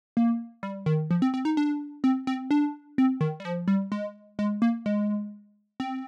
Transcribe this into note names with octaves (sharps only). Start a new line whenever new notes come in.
A#3
G3
D#3
F3
C4
C4
D#4
D4
C4
C4
D4
C4
D#3
G3
F3
G3
G#3
G#3
A#3
G#3
C4